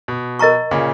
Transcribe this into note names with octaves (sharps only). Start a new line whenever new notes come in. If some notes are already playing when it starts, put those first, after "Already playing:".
B2
A#4 D#5 A#5 C#6
A#2 C#3